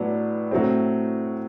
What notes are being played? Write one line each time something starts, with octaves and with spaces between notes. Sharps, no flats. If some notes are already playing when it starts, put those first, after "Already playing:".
Already playing: A2 F#3 B3 D4
A2 F#3 A3 C4